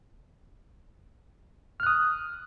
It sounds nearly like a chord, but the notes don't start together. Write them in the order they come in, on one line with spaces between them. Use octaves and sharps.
F6 F#6 D#6